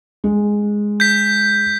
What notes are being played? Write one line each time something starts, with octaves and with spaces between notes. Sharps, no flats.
G#3
G6 B6